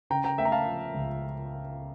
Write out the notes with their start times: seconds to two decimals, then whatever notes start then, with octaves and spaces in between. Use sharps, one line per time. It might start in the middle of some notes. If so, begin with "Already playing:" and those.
0.10 C#3 G5 A#5
0.24 G5 A#5
0.38 A3 E5 G5
0.45 A#5
0.52 F5 A5
0.66 F3
0.94 C#2